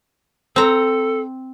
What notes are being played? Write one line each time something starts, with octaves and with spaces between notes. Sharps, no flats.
C4 A4 A#5